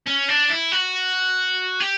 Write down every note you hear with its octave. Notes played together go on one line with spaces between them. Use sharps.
C#4
D4
E4
F#4
G4